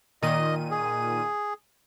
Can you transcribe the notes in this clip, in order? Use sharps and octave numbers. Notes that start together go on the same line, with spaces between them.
A#2 D#3 D#5 D#7
G#4